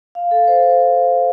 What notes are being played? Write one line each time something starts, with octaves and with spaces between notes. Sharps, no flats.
F5
A4
C5